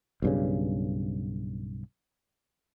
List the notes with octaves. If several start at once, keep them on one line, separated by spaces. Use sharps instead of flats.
B1 G2 C#3